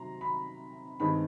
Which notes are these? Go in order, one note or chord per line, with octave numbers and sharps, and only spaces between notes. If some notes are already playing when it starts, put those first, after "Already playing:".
Already playing: C3 D#3 F#3 A#5 C6
B5
G2 D#3 G#3 C4 B5